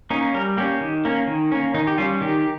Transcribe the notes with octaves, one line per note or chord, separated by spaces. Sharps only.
A#3 C#4 D#4
G3 A#4
A#3 C#4 G4
D#3
A#3 C#4
D#3
A#3 C#4
D#3 D#4
G4
G3 C#4 F4
D#3 G4